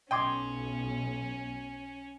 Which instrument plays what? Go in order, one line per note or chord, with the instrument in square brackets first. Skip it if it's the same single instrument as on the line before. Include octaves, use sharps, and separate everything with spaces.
[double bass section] B1 B2 [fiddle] C#4 [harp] D#5 C6 G#6 [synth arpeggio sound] G5 D6